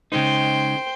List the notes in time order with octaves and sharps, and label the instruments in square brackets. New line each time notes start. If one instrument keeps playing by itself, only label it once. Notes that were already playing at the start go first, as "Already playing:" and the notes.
[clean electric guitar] C#3 G#3 D#4 [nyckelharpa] C5 G5